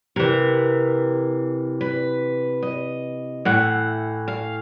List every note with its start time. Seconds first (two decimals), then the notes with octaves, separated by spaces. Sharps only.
0.16 C3 E3 A#4
1.81 B4
2.62 D#5
3.45 A2 E3 F#5
4.28 F5